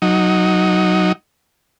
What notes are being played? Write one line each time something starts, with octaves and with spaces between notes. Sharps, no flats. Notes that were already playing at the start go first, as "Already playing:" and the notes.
F#3 D#4